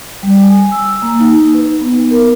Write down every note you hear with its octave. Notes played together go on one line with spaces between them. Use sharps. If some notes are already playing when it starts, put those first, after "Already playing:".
G3
G#5
E6
A#3
D#4
B4
B3
A#4